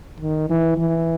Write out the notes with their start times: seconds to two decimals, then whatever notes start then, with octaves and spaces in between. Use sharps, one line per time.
0.20 D#3
0.50 E3
0.78 E3